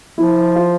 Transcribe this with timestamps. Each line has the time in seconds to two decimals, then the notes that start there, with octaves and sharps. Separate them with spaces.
0.18 F3 E4
0.56 F4